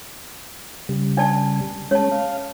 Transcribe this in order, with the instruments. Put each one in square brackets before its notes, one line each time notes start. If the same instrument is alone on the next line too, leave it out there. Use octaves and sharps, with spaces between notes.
[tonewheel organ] C#3 G3
[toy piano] D4 D5 A5
[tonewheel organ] G#3 C#4 [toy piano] C#5 A5
[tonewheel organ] F5